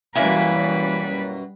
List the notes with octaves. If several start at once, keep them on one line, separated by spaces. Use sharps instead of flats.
F#2 B2 E3 G3 A#3 E4 B4 G#5